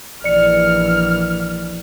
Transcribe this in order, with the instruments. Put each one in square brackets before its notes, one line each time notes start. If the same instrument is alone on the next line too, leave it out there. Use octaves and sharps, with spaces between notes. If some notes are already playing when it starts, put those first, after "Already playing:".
[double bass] A#1 E3 [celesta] D5 C#7 [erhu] F6